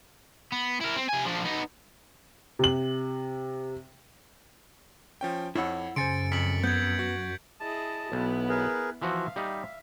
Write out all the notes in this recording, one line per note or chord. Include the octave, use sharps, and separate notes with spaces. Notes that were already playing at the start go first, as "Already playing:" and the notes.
B3
E4 A#4
C4
C3 G#5
F3 D4
B3 D#4
C3 F#7
F3 C#4 G5
F2 E4 C#5 F#5 E6
F#2 C#3 C5 G#5 C6 A6 C#7 D7
F2 B6 F#7
B3 G6 G#6
F#4
E4 G#4 D#5 A5
B1 B3 E4
G#4 A#4 B4
E3 F3 F#4 E5 F5
G3 D#4 E5